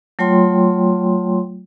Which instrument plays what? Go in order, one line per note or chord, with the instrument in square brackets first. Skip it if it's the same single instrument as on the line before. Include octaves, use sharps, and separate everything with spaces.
[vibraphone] F#3 A3 F4 C#5 G5 C6